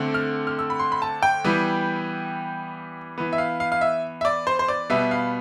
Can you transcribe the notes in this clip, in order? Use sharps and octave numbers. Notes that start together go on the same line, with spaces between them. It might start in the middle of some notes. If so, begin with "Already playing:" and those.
Already playing: D3 A3 C4
F6
F6
E6
B5
C6
B5
A5
G5
E3 G3 B3
E3 B3
E5
F5
F5
F5
E5
E5
D5
C5
C5
D5
B2 G3 B3 E5
F5